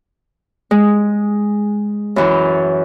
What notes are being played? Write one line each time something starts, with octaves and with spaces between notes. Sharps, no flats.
G#3
F#2 E3 F#3